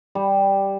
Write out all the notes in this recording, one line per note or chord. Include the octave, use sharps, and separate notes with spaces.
G3